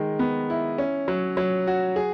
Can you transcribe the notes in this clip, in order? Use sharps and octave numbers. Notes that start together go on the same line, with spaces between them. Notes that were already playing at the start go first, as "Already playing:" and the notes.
Already playing: D#3 G#3
B3
E4
C#4
F#3
F#3
F#4
G#4